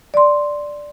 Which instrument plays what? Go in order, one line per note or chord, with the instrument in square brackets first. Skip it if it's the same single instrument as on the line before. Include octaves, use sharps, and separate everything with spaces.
[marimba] D5 C6